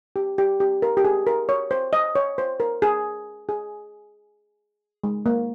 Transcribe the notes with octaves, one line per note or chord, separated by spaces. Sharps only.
G4
G4
G4
A#4
G4
G#4
A#4
C#5
C5
D#5
C#5
C5
A#4
G#4
G#4
G#3
A#3